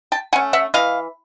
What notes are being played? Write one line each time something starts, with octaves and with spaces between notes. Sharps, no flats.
G5 A5
A3 C#4 F#5 G#5
E5 F#5
E3 D#5 F5